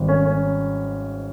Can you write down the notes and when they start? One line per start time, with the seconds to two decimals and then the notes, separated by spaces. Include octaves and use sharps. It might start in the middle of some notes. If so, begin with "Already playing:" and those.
Already playing: G#1 G#2 G3
0.08 C#4
0.26 C#4